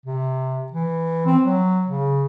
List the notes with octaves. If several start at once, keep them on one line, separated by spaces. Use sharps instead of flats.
C3
E3
C4
F#3
C#3